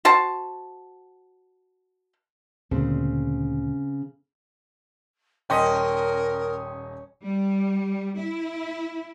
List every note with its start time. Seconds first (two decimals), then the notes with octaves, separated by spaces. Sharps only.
0.05 F#4 C5 A5
2.71 D2 A#2 C#3 C4
5.50 D#1 C#4 A#4 D#5 G5 C6
7.25 G3
8.19 E4